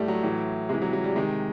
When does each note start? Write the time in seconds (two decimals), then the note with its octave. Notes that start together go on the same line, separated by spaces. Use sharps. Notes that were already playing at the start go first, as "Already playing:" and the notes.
Already playing: A2 G3 A3
0.08 F#3
0.23 A2 E3
0.69 C3 E3 G#3
0.82 F#3
0.93 F#3
1.04 G3
1.16 C3 D#3 G#3